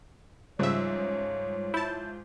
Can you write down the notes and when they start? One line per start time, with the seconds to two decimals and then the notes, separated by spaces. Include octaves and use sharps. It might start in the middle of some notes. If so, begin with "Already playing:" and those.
0.59 G#2 C#3 F3 G3 C#5 E5
1.74 E4 A5 G6